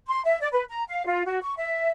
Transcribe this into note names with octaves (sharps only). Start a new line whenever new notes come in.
C6
E5
D5
B4
A#5
F5
F4
F#4
C#6
E5